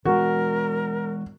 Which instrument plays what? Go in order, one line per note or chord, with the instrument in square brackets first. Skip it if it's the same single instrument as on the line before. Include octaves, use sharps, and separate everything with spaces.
[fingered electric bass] E3 G#3 [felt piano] F#4 [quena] A#4